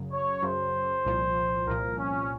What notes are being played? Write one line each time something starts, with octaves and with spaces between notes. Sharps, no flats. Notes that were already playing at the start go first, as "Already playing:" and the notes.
Already playing: F#2 C#3 F#3
C#5
F#2 C#3 F#3 C5
C2 A#2 F3
C2 A#2 F3 A#4
C#4